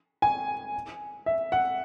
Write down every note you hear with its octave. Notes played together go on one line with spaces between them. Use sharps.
G#5
E5
F#5